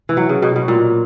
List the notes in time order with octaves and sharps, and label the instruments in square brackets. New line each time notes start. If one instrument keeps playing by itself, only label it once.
[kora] E3
F#3
C#3
B2
B2
A#2